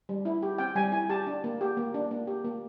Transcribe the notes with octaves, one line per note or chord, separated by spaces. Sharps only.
G3
E4
G4
C4 G5
G3 G#5
E4 G#5
G4 A5
D4
A#3
G4
A#3
D4
A#3
G4
A#3